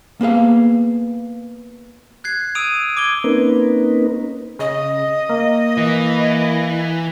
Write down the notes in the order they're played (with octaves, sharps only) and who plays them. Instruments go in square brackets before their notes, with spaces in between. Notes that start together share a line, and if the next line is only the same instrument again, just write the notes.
[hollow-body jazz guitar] A#3 B3 G#4 F5
[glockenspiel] F#6 G#6 C7
D#6 E6 D7 D#7 F7
D6 G#6 D7 G7
[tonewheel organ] A#3 C4 C#4 D#4 A#4 B4
[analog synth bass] C#3 [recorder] D#5
[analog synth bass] A#3
[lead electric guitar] E3